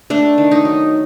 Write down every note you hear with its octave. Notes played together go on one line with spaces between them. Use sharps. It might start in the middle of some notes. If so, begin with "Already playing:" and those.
A3 D4
D#3
D#4
F#3